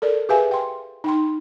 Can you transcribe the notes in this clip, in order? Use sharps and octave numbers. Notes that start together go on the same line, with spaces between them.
A4 A#4 D5
G4 G#4 B4 E5 F5 G#5
G5 C6
D#4 G5 C6